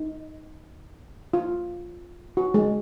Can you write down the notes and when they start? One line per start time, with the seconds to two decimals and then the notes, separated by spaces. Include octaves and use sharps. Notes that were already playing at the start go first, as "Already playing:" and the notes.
Already playing: D#4
1.33 F4
2.37 F#4
2.54 G#3